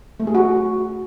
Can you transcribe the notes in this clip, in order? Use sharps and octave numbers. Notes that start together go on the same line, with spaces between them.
A3
G#4
F#4